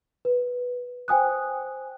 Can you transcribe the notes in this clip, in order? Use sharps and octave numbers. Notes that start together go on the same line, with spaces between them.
B4
C5 G5 G#5 D#6 F#6